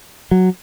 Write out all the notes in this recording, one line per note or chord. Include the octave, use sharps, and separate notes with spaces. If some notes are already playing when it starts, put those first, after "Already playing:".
F#3